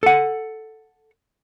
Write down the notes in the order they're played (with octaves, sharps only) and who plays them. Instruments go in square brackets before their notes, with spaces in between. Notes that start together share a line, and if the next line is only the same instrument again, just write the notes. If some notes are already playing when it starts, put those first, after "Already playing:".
[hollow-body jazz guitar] A4 F#5